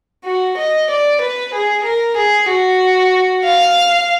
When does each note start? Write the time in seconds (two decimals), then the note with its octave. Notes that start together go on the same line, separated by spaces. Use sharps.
0.25 F#4
0.57 D#5
0.90 D5
1.21 B4
1.53 G#4
1.84 A#4
2.17 G#4
2.48 F#4
3.44 F5